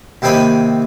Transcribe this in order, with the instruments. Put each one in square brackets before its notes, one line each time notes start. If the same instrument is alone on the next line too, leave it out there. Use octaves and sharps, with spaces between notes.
[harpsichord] D#2 C3 C4 G#5 B5 D#6